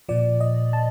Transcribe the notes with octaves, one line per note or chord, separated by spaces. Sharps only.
A#2 F3 D5
D#5
A5